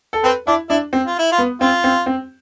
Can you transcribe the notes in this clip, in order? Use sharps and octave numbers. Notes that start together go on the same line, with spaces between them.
A4
C4 B4
D4 E4
D4 E4
C4
F4
E4
F4
B3
C4 F4
C4
C4